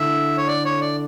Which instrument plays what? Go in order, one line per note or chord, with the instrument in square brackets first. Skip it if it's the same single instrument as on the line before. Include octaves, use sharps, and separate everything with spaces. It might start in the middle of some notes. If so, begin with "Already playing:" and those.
Already playing: [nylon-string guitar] D3 A3 E4 [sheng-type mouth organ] E5
[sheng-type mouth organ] C#5
D5
C#5
D5